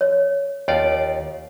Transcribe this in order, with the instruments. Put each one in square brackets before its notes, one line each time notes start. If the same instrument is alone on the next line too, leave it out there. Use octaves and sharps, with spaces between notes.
[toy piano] C#5
[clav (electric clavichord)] D#2 F4 D5 [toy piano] C#5